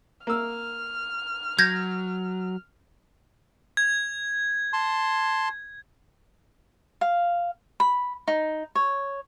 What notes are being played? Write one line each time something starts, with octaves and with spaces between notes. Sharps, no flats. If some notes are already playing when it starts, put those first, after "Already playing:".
A#3 E6 F6
F#3 G6 G#6 A#6
G#6
A5 C6
F5
B5
D#4
C#5